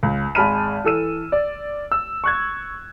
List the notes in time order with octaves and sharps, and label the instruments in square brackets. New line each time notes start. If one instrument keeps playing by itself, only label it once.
[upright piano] C#2
G#1 G#3 A5 B5 F6 D#7
E3 A4 E6 D#7
D5
E6
C#6 F#6 G#6